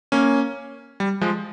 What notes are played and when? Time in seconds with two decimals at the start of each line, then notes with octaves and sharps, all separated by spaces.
0.12 A#3 C#4
1.00 G3
1.21 F3 G#3